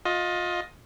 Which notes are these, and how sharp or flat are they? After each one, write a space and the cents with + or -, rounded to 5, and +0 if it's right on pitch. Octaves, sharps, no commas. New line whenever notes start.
F4 +25 D#5 +15